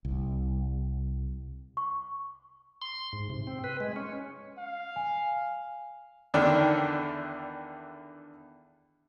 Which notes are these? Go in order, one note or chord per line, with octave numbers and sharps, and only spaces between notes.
C2
C#6
C6
G#2
C3
C4
B4
G#3
C#4
F5
G#5
E2 D3 D#3 D4 G5 F6